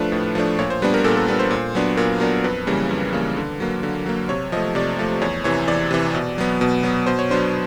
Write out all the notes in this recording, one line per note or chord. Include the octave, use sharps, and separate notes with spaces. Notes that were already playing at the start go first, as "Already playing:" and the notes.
Already playing: F3 A3 D4 B4
A2
F3 A3 D4
A#2 C#5
C5
G3 B3 D4 B4
A#4
A#2 A4
A4
G3 B3 D4 B4
C5
A#2
F#3 B3 D4
A#2 A#4
F#3 B3 D4 A#4
F2 B4
C#3 E3 G3 A#3
F2
C#3 E3 G3 A#3
D3
F#3 A#3
D3
F#3 A#3
C3 C#5
F3 A3 D#5
C3 D5
F3 A3
E2 C#5
C3 E3 C#5
E2 D5
C3 E3
B2
F#3 B3
B2
F#3 B3
B2 C5
C#5
F#3 B3 D4 C5